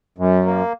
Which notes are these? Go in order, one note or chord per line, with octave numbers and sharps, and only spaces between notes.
F#2
A#3